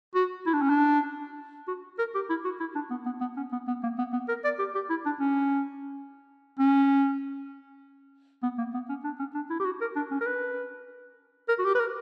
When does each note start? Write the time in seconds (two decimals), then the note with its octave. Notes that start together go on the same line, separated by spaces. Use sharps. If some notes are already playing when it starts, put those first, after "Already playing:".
0.15 F#4
0.46 E4
0.53 D4
0.61 C#4
0.70 D4
1.68 F#4
1.99 A#4
2.15 G4
2.30 E4
2.45 F#4
2.60 E4
2.75 D4
2.90 B3
3.06 B3
3.21 B3
3.37 C#4
3.52 B3
3.67 B3
3.83 A#3
3.98 B3
4.13 B3
4.29 A#4
4.44 D5
4.59 G4
4.75 G4
4.89 E4
5.06 D4
5.20 C#4
6.59 C#4
8.43 B3
8.58 A#3
8.74 B3
8.89 C#4
9.04 D4
9.19 C#4
9.35 D4
9.50 E4
9.60 G4
9.65 F#4
9.81 A#4
9.96 D4
10.11 C#4
10.21 A#4
10.27 B4
11.49 A#4
11.59 F#4
11.65 G4
11.75 B4
11.80 A#4